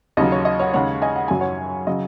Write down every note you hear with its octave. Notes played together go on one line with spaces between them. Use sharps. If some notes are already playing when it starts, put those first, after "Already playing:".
D#2 C#3 F#3 D#5
C#5
D#5
C#5 F#5
D#2 C#3 G#3 C#5 F#5
D#5 G#5
F#5
F#2 C#3 F#3 G#5
C#5 F#5
C#3 F#3 D#5